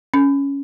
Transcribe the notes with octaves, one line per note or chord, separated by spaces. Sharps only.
C#4